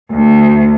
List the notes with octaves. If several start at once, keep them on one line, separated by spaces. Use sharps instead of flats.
D2